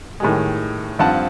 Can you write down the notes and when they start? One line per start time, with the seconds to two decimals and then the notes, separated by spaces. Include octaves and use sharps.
0.20 A2 D#3 G3 G#3
0.99 G2 F3 C4 F#5 A5